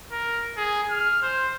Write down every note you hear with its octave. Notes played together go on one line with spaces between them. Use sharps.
A#4
G#4
F6
C5